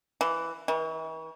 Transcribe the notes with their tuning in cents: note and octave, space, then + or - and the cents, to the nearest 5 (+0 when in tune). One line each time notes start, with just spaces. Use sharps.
E3 +5
E3 -45